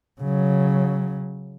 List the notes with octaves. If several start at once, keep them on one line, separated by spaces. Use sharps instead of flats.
C#3 F#3